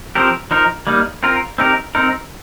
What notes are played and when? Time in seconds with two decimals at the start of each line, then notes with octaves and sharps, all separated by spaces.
0.15 F3 C4 G4 A#4
0.51 F3 D#4 A#4
0.87 G3 A#3 D#4
1.23 C4 F4 A#4
1.58 C4 D#4 G4 A#4
1.95 C4 D#4 A#4